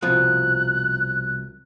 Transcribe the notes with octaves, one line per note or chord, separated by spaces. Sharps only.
C2 B2 F3 F#6